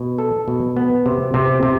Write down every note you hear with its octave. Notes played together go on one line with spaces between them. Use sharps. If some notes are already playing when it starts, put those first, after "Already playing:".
Already playing: B2
A4
B2
B3
C3
C3
C3